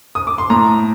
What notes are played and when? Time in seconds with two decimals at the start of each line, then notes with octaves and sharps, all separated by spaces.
0.15 D#6
0.27 D6
0.38 C6
0.50 A2 A#5